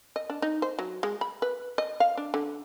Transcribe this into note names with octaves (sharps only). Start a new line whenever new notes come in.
D#5
D4
D#4
C5
F#3
G#3
B5
B4
D#5
F5
D4
D3